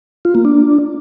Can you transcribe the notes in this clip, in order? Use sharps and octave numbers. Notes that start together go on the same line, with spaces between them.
F4
A#3
D4